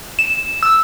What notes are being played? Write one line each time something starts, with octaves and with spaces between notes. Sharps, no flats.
E7
E6